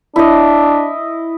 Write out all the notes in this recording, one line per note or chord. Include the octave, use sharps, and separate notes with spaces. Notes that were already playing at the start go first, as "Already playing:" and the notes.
D4 E4 D#5